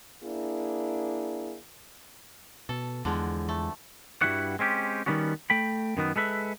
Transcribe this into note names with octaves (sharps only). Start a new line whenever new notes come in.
A#3 D4 E4 G#4
B2 A4
E2 D3 F3 G#3 B3
A3
G2 C#3 G3 E4 F#4 F#5
G#3 C4 C#4 G4
D#3 E3 G3 B3 C#4 F#4
A3 G5 B5
F#2 D#3 B3
G#3 A4 B4 E5